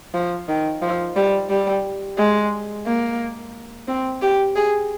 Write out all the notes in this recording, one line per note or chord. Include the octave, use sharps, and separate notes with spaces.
F3
D#3
F3
G3
G3
G#3
A#3
C4
G4
G#4